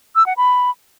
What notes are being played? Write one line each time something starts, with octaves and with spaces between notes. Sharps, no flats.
E6
F#5
B5